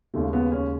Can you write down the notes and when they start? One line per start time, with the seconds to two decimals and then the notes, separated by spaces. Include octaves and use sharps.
0.14 D#2 C#3 G#3 A3
0.33 B3
0.52 C#4